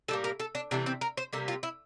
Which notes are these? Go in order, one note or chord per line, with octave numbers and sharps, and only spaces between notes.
A2 G3 A#3 A4
A#4
A4
D4
C3 E3 A3 D4
C4
A#4
C5
C3 G3 A#3 A4
F4
E4